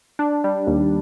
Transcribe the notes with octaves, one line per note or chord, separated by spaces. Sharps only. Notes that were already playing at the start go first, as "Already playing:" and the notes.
D4
G3
D#2